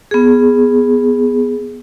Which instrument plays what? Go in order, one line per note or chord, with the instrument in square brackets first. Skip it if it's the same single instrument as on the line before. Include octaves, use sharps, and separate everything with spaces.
[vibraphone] B3 G#4